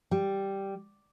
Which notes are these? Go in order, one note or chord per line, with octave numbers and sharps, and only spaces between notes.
G3